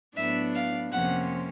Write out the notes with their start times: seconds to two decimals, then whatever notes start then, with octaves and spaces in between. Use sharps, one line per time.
0.16 A2 F#3 B3 D4 E5
0.55 F5
0.92 F2 C3 F3 A#3 C#4 F#5